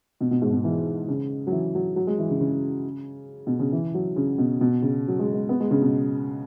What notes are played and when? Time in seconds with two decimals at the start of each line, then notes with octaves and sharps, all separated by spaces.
0.21 B2
0.31 B2
0.42 G#2
0.52 B2
0.64 E3
1.08 C#3
1.47 F#3
1.52 E3
1.75 F#3
1.96 F#3
2.07 G#3
2.18 E3
2.30 C#3
2.40 C#3
3.47 B2
3.60 C#3
3.72 E3
3.94 F#3
4.16 C#3
4.38 B2
4.61 B2
4.82 C#3
5.08 F#3
5.19 G#3
5.34 G#3
5.49 B3
5.60 G#3
5.71 C#3
5.82 B2